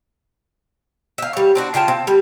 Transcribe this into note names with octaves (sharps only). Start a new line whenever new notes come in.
E5 F5
G3 C#5
C4 D4 F#4
C#3 F4 G5 A5
C4
G3